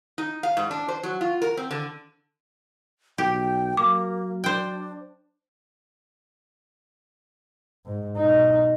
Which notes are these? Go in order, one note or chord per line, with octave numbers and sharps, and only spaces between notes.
D#4
F5
G#2
D4
C5
F#3
F4
A#4
C4
D3
B1 G4 G5
F#3 A#3 D6
D4 C5 G5
G#2
B2 D#4